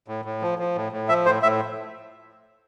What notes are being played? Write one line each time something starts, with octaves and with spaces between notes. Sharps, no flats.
A2
A2
F3
F3
A2
A2
F3 E5
A2 C5
A2 E5